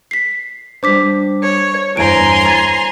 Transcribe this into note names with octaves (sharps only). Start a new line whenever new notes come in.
B6 C7
G3 D4 C5 D6 B6
C#5
G1 E2 C5 C#5 G#5 A#5 C6 D7
G#6 A6